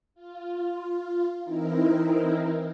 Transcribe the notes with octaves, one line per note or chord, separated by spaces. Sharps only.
F4
E3 C4 D#4 E4 A#4